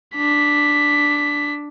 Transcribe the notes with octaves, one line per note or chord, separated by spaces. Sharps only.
D4 B6